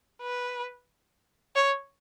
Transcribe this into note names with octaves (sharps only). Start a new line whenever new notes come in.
B4
C#5